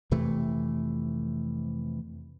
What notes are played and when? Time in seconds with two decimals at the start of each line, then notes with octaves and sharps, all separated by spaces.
0.11 F2 C3 E3 A3